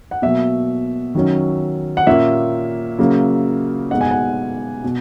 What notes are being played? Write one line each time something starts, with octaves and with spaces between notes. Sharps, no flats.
F#5
B2 F#3 A#3 E5
D#3 F#3 C#4
F#5
A#2 A#3 C#4 E5
C#3 F#3 A#3
B2 G#3 B3 D#4 F#5
G#5
F#5
B2